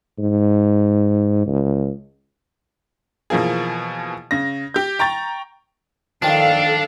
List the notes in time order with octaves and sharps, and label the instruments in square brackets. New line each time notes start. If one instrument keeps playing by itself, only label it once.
[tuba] G#2
C#2
[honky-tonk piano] B2 E3 F3 A#3 G#4
C#3 A#6
G4 G6
G5 A#5 C#6 A6
[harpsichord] D#3 F3 [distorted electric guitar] D4 [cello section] A4 F5